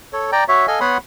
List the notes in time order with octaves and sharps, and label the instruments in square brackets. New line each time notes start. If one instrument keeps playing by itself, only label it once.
[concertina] A4 C#5
D5 G5 A#5
F#4 C#5 E5
A4 D#5 F5 G#5
B3 C#5 F#5 B5 C6 D#6